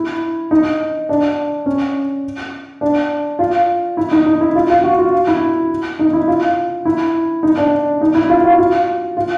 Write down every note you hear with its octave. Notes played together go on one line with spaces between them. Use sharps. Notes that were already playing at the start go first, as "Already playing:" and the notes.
Already playing: E4
D#4
D4
C#4
D4
F4
E4
D#4
D#4
E4
F4
F4
F#4
F4
E4
D#4
E4
F4
E4
D#4
D4
D#4
E4
F4
F#4
F4
F4